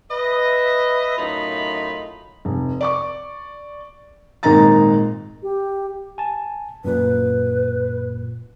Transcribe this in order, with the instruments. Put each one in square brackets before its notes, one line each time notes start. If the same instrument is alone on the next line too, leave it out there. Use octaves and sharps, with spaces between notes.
[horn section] B4 D#5 E5
F#2 A2 D#4 F4 D#5 B5
[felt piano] F1
D5 C#6 D6
G#1 A#2 G#3 D#4 A#5 A6
[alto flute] G4
[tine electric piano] G#5 A5
[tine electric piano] F#2 A#2 [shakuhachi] B4